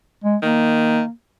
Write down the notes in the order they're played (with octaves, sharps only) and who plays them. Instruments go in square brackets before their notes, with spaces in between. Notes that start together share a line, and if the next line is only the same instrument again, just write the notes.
[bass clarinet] G#3
[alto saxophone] D#3 [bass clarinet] A#3